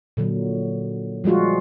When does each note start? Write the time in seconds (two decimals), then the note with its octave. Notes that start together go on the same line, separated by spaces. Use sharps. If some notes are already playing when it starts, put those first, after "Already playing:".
0.17 A#2 D3 F#3
1.24 F3 G3 G#3 F4 F#4